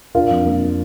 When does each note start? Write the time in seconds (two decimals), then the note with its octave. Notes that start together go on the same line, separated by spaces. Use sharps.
0.15 D4 F4 A#4
0.31 F2
0.46 A#3